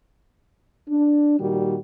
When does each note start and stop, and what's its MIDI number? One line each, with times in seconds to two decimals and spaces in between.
0.88 1.35 62
1.39 1.77 46
1.39 1.77 51
1.39 1.77 55
1.39 1.77 66